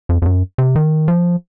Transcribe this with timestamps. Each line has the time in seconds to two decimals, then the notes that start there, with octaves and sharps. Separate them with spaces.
0.09 F2
0.22 F2
0.26 F#2
0.58 C3
0.76 D#3
1.08 F3